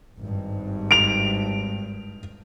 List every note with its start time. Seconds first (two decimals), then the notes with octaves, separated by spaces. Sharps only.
0.18 G#1 G2
0.91 D7 F7